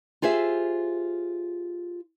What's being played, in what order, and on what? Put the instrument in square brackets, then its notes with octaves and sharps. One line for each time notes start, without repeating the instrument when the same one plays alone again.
[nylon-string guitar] F4 G4 G#4 C5 E5